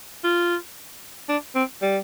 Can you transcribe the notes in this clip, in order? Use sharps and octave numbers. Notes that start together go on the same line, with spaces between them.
F4
D4
C4
G3